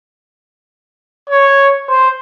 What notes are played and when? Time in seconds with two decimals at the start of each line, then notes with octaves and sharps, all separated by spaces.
1.30 C#5
1.89 C5